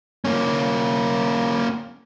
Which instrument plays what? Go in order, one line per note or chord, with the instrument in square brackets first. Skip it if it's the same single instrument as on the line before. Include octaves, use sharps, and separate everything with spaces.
[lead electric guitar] A#3 C#4